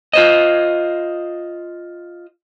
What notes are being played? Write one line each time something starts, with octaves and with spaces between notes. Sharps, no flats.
F4 C5 D#5